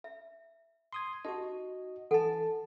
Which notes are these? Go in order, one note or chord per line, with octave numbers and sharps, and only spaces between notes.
E5
C6 D#6 G#6
D#4 F#4 G4 D#5
E3 A4 F#5 G#5 A5